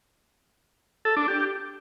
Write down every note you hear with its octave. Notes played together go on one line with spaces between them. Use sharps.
A4
D4
G4